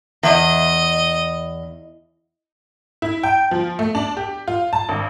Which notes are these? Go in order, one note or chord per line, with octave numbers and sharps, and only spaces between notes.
E2 D#5
E4
G5
F3
A3
D4
G4
F4
A5
G#1